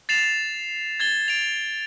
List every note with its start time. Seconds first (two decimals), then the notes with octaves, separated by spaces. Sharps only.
0.09 A6 C7 E7 F7
1.00 G#6 A6 G7
1.28 D7 F7